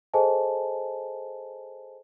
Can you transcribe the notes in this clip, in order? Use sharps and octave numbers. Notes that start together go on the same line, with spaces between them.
G#4 A4 C5 D#5 G#5 A5